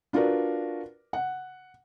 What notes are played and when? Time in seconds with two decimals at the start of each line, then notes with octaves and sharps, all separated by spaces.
0.13 D4 F4 F#4 A#4 B4 D5
1.13 F#5